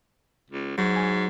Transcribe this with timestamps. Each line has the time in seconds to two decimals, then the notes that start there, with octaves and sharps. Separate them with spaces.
0.50 C#2
0.77 G#2 F#3
0.96 G#5